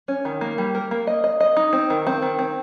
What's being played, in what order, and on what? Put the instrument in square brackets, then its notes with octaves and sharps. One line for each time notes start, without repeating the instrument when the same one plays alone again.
[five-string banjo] C#4
D#3
A#3
G3
A#4
A#3
D#5
D#5
D#5
D#4
C4
D#3
C4
D#3
C4